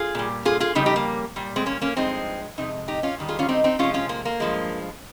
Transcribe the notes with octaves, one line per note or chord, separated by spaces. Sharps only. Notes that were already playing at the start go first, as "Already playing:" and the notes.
Already playing: F4 G#4
A#2 G3
F4 G#4
F4 G#4
F2 C#3 G3 D#4 G4
D#4 G4
A#3
A#2 G3
G#3 C4
A#3 C#4
A#3 C#4
G2 F3 G#3 C4 D#4
F2 C3 G#3 D#4
D#4 G4
C#4 F4
G#2 D#3 G3
F4 G#4
C#4 F4
C4 D#4
C4 D#4
C3 F3 G#3 C#4 F4
C#4 F4
A#3
A#3
G2 F3 G#3